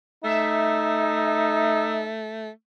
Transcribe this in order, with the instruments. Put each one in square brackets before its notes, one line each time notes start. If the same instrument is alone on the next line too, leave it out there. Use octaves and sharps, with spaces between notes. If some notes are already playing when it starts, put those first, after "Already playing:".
[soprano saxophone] A3 [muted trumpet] D#4 [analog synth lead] E5